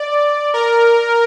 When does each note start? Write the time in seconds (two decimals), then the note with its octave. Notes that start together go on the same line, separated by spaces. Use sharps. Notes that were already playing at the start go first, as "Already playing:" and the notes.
Already playing: D5
0.54 A#4